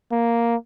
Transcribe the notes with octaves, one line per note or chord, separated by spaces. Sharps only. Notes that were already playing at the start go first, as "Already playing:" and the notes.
A#3